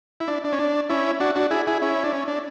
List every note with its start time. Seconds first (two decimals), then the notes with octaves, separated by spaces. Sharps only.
0.20 E4
0.28 D4
0.44 D4
0.52 C#4
0.59 D4
0.89 C#4 E4
1.20 D4 F#4
1.35 D4 F#4
1.51 E4 G#4
1.67 E4 G#4
1.82 C#4 E4
2.04 D4
2.13 C#4
2.28 D4